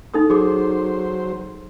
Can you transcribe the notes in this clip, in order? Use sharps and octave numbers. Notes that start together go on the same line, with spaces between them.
D#4 A4 D#6
F#3 G#4 C5 D6